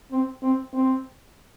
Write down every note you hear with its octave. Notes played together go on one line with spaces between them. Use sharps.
C4
C4
C4